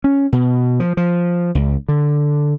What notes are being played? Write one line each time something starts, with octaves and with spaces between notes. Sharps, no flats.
C#4
B2
F3
F3
C#2
D3